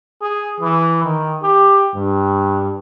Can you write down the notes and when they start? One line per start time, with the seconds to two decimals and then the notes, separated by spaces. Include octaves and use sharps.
0.22 G#4
0.61 E3
1.04 D#3
1.43 G4
1.94 G2